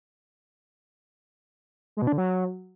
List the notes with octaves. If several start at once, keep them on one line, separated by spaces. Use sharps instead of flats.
G#3
B2
D4
D3
F#3